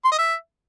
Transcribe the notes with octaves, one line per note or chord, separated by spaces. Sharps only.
C6
D#5
E5